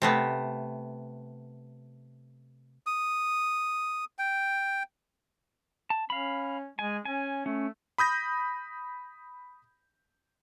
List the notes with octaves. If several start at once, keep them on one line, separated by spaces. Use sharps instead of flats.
C3 A3 B3
D#6
G5
A5
C#4 F5 B5
G#3 G#5
C#4 G#5
A3 C#4
B5 D#6 G6 A#6